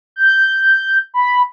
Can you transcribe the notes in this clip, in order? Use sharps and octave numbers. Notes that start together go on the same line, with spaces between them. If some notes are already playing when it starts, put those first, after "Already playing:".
G6
B5